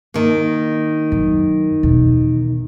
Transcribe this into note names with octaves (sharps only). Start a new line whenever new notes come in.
D#3 A#3
F#2
E2 B2